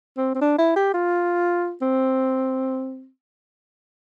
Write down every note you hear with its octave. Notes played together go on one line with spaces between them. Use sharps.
C4
C4
D4
E4
G4
F4
C4